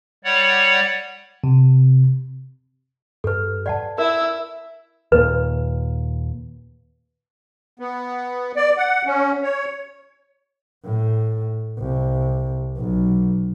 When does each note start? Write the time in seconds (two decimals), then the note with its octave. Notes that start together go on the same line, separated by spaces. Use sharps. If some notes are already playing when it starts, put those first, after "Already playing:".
0.24 G3 C#5 D5 F#5
1.44 C3
3.24 G2 A4 B4
3.66 D5 F#5 A5
3.98 E4 A#4 E6
5.12 D#2 A#2 B4
7.79 B3
8.56 D5
8.78 F#5
9.06 C#4
9.43 C#5
10.85 A2
11.79 C2
12.78 B1